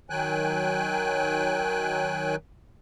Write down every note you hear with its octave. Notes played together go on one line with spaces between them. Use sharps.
D#3 F#3 G5 G#5 F#6